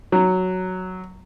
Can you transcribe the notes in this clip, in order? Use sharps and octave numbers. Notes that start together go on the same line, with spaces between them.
F#3